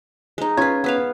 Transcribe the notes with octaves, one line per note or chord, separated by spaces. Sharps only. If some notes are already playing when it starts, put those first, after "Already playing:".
G#3 D#4
C#4 F4 B4 C#5 G#6
B3 B4 F5